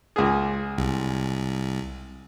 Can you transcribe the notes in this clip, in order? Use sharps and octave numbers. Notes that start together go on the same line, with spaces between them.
C#2 G#4
C2